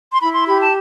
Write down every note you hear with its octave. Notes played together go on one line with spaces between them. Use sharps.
C6
E4 B5
C6
G4 B5
A5